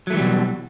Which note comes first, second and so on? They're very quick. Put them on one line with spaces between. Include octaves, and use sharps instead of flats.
F#3 A3 E3 G3 B2